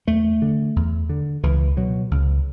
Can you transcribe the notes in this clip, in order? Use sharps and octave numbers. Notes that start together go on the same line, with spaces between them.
E2 A3
D3
E2
D3
C#2 E3
B2 F#3
C#2